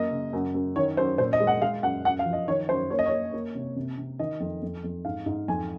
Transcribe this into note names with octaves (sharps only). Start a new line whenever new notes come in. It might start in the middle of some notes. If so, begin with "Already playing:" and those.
Already playing: F#2 A#3 D#5
C#3
F#2
F#2
D#3 C#5
F#2 C5
A#2 C5
D#5
G#3
F#5
G#3 F5
F#2 F#5
F#2 F#5
F5
F3
D#5
D#3 C#5
F#2 C5
A#3 C#5
D#5
C#5
A#3
A#3
C3
C3
C3
D#3 D#5
F2
F2
F2
G#2 F5
G#2
F2 G#5